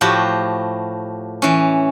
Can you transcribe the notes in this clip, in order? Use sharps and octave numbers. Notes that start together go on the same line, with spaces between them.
A2 F3 F#4 G4
E3 C#4